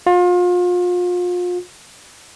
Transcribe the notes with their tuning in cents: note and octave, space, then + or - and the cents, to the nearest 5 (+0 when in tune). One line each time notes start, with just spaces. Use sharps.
F4 +35